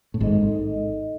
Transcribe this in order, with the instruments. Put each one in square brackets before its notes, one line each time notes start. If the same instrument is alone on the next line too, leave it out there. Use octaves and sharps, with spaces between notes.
[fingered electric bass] A2
[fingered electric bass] G#1 G#2 [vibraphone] D#4 A4 D#5